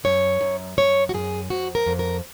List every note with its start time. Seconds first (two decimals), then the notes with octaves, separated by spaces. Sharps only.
0.04 F#2 C#5
0.41 F#2
0.77 F#2 C#5
1.09 F#4
1.14 F#2 G#4
1.50 F2 F#4
1.75 A#4
1.86 F2
1.99 A#4